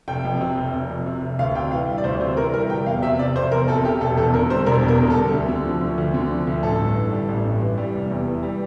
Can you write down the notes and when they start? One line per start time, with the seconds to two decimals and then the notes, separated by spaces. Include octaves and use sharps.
0.08 F1 G5
0.25 F2
0.41 C3
0.57 F1
0.74 F1
0.90 F2
1.06 C3
1.22 F1
1.39 D2 F5
1.55 C3 G5
1.71 E3 F5
1.88 G3
1.98 D5
2.04 D2 C5
2.21 C3 C5
2.37 E3 A#4
2.53 G3 A#4
2.70 F1 G5
2.86 E2 F5
3.02 C3 E5
3.19 F1 D5
3.36 F1 C5
3.52 E2 A#4
3.68 C3 A4
3.85 F1 G4
4.01 E1 A4
4.17 E2 A4
4.34 D3 A#4
4.50 G3 C5
4.66 E1 A#4
4.83 E2
4.88 A#4
4.99 D3
5.10 A4
5.16 G3
5.32 D2
5.48 D3
5.65 F3
5.81 D2
5.98 D2
6.14 D3
6.30 F3
6.47 D2
6.63 A1 A4
6.79 G2
6.96 E3
7.12 G3
7.29 A1
7.45 G2
7.61 E3
7.78 G3
7.94 F1
8.11 E2
8.27 E3
8.43 G3